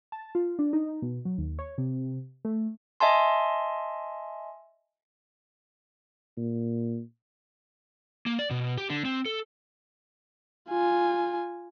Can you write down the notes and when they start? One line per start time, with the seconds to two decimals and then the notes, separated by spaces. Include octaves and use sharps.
0.12 A5
0.35 F4
0.59 D4
0.73 D#4
1.02 B2
1.25 F#3
1.38 D#2
1.59 C#5
1.78 C3
2.45 A3
3.00 D#5 E5 G#5 A5 C6
6.37 A#2
8.26 A#3
8.39 D5
8.51 B2
8.78 G4
8.90 D3
9.05 C4
9.26 A4
10.70 F4 G#5